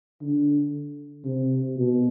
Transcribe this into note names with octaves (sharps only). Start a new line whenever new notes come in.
D3
C3
B2